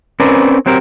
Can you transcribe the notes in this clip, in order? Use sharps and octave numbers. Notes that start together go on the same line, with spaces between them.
C4 C#4 A#4 B4 D5
F#3 C4 G4 A#4